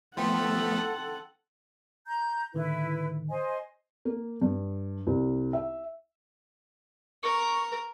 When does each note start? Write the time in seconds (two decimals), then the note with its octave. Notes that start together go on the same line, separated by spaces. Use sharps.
0.17 F3 A3 B3 A4 F#5 G5 C6
2.07 A#5 G6
2.54 A2 D3 D#3 E4 B4
3.29 C5 D#5 G#5
4.05 A#3
4.42 G2
5.07 C2
5.53 E5
7.23 A#4 C#6